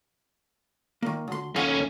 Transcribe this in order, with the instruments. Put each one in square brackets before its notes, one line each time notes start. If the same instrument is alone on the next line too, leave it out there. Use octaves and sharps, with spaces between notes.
[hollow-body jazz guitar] D#3 A#3
D2 C6
[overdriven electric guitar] D#2 C#4 [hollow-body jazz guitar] A4 F5 F#5